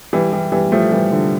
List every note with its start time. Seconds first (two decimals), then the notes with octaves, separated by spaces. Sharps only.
0.13 E3 G3
0.32 E3 G3
0.52 E3 G3
0.72 F3 A3
0.92 E3 G3
1.12 D3 F3